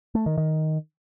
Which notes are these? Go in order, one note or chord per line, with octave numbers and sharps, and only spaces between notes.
A3
D#3
D#3